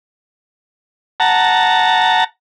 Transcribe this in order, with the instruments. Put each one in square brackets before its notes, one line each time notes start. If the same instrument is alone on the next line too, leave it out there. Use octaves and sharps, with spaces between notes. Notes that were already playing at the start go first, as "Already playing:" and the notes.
[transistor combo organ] F#5 A5 A#5